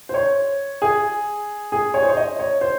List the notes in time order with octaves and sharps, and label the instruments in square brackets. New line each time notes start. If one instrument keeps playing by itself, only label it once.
[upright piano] C5
C#5
G#4
G#4
C#5
C5
C#5
D#5
C#5
C5